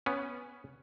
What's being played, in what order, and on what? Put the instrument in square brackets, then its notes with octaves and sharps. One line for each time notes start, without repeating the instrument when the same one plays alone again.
[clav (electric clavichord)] B3 C#4